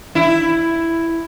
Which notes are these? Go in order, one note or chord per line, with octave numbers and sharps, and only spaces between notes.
E4